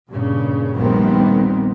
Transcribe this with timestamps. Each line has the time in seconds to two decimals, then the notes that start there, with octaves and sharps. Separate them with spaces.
0.10 G2 A#2 C#3
0.75 A#1 D#2 D#3 G3 B3 C4